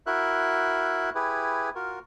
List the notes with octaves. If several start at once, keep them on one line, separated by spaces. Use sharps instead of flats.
E4 F#4 A#4 E5 F#6
E4 G4 G#4 B4
F4 F#4 A#4